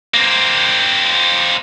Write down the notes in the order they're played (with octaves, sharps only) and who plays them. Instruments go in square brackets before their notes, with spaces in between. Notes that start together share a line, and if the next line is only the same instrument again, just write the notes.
[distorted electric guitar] A#3 C4